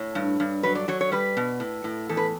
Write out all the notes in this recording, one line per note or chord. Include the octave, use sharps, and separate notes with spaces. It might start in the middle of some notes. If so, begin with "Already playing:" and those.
Already playing: A2 C#5
G2
G2
F#3 B4
D5
F#3 C#5
C#5
G3 B4
B2
A2
A2
E2 A4
B4